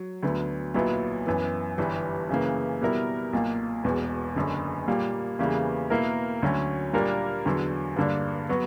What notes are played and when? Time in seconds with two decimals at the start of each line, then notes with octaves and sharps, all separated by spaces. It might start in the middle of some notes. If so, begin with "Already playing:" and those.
Already playing: F#3
0.23 D2 D3 F#3 B3
0.74 B1 A#2 F#3 B3 E4
1.26 F#2 E3 B3
1.78 G1 G2 E3 G3
2.29 F#2 C#3 E3 A#3
2.82 B2 G3 B3 E4 A#4
3.33 B1 A#2 A#3
3.84 E1 E2 B2
4.36 F#1 F#2 D3
4.88 A#2 G3 A#3
5.39 E2 C#3 E3 G3 A#3
5.90 B2 A#3 E4 A#4
6.42 D2 D3 F#3 C#4 F#4
6.93 A#2 G3 A#3 D4 A#4
7.45 E2 D3 F#3
7.96 G2 D3 A#3 D4
8.49 F#3 B3 F#4